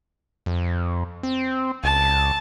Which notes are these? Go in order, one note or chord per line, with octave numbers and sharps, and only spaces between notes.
F2
C4
C#2 A5